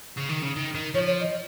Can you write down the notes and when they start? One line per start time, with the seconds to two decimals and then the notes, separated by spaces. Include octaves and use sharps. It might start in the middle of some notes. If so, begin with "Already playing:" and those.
0.17 C#3
0.30 D#3
0.42 C#3
0.56 D#3
0.75 D#3
0.94 F3 C#5
1.07 C#5
1.20 D#5